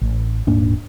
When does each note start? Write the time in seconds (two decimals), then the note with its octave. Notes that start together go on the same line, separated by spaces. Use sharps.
0.01 A1
0.47 D#1 G#2 A#3 D4